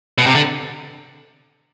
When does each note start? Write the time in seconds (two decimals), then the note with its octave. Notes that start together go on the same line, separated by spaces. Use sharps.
0.18 B2
0.26 C3
0.35 D3